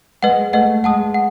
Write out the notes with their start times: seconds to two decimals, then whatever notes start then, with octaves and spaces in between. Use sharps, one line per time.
0.23 G#3 B4 D#5 F#5
0.53 A3 B4 D#5 F#5
0.84 G#3 F#5 A5 D#6
1.14 F#5